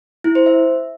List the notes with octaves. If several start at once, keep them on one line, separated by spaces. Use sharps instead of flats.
E4
C5
E5